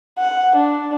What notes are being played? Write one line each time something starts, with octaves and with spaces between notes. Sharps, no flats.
F#5
D4